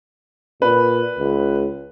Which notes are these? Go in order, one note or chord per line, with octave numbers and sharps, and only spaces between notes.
A#2 B4
C#2